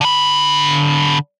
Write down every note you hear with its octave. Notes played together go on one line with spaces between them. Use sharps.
D3 B5